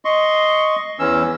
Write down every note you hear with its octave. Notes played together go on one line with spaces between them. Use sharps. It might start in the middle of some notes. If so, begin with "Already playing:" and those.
D#5 C6 C#6
E2 E3 C#4 E6